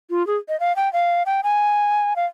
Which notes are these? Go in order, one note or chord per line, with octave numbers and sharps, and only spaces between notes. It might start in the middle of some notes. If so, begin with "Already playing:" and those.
F4
G#4
D#5
F5
G5
F5
G5
G#5
F5